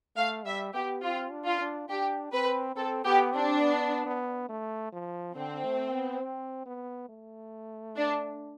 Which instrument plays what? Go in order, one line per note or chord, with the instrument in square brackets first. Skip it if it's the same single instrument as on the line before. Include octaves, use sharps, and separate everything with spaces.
[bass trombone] A3 [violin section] F5
[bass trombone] G3 [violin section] E5
[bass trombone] B3 [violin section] G4
[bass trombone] C4 [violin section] F4
[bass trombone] D4
[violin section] F4
[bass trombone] D4
[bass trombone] D4 [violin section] G4
[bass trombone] C4 [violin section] B4
[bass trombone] C4 [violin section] A4
[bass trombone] B3 [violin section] G4
[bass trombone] C4 [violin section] D4
[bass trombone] B3
B3
A3
F3
[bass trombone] D3 [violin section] C4
[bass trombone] A3
B3
C4
B3
A3
[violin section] D4